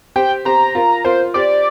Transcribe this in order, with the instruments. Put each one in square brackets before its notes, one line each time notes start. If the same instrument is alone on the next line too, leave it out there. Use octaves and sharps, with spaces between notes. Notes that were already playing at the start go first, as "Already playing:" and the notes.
[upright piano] G4 C5 [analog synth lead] G5
[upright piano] G4 C5 [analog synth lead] A#5
[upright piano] F4 A#4
[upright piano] F4 A#4 [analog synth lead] C5
[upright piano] G4 C5 [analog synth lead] D5